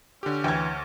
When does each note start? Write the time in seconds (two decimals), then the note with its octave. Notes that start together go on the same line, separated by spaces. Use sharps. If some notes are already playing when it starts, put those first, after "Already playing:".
0.23 D3 C#4 G4
0.44 D2 E3 G5 G#6